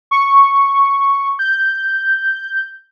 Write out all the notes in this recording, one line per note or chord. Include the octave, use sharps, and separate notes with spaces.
C#6
G6